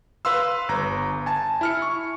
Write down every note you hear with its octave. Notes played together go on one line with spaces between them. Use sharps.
B4 F5 C6 E6
G1 A#5
G#5 A5
E4 F6 C#7
C#6